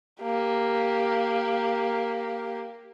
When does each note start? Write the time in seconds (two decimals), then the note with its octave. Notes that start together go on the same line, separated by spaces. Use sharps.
0.21 A#3 G4